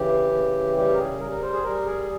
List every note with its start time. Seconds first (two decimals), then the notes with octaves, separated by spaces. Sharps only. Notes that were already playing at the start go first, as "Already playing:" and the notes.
Already playing: C#3 E3 G4
0.32 C#3
0.76 G3 G4
0.93 A#4
0.98 G#4
1.20 G3 A#4
1.31 A#4
1.42 C5
1.53 G#4
1.63 G3 A#4
1.86 G#4